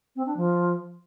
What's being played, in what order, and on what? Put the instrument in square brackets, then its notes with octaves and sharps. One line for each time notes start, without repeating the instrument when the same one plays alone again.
[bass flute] C4
D4
F3